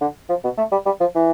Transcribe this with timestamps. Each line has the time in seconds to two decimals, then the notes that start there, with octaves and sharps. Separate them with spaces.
0.01 D3
0.29 F3
0.44 B2
0.58 A3
0.72 G3
0.86 G3
1.01 F3
1.15 E3